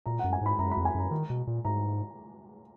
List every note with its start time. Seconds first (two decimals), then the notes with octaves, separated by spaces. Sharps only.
0.06 A#2 A#5
0.19 F#2 F#5
0.33 G#5
0.41 G#2 B5
0.59 F#2 A#5
0.71 B5
0.77 F2
0.85 G#5
0.95 F#2 A#5
1.11 D#3
1.30 B2
1.47 A#2
1.65 G#2 A#5